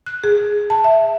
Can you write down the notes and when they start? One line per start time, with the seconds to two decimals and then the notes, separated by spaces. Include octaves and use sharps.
0.06 F#6
0.24 G#4
0.70 A5
0.84 E5